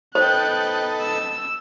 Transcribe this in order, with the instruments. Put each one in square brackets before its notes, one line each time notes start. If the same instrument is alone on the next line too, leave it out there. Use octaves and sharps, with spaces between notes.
[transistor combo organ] B3 D#4 A4 [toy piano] C5 [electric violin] G5 F#6
[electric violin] E6